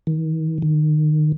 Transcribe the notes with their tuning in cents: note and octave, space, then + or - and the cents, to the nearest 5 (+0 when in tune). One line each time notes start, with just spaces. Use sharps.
D#3 +40
D#3 -30